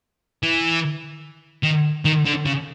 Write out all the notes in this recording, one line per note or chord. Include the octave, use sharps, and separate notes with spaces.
E3
D#3
D#3
D3
C#3